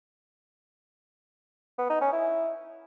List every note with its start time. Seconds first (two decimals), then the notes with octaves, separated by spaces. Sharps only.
1.79 B3
1.90 D#4
2.01 C#4
2.13 E4